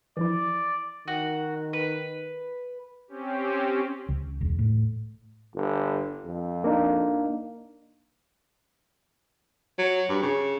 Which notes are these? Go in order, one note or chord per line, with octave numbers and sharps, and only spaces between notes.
E3 F3 E4 D5
D#3 F#4
B4
C4 C#4 G4
C#2
E1
A2
G1
F2
A#3 D4 D#4
F#3
G2
C#3